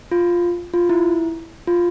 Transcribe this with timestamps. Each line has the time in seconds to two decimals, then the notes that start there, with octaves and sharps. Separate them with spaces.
0.11 F4
0.74 F4
0.89 E4
1.67 F4